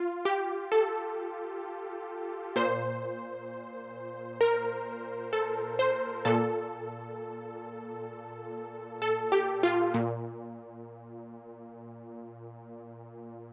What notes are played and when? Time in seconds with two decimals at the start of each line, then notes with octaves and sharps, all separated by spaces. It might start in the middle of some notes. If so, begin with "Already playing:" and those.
Already playing: F4
0.25 G4
0.72 A4
2.56 A#2 C5
4.41 A#4
5.33 A4
5.79 C5
6.25 A#2 A4
9.02 A4
9.32 G4
9.63 F4
9.94 A#2